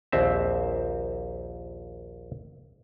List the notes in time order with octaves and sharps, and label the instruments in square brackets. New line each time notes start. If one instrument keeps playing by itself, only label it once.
[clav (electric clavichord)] A#1 D#2 C4 E5